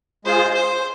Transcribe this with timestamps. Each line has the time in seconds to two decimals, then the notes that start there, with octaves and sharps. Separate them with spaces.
0.25 G#3 F4 G#4 C5
0.54 C5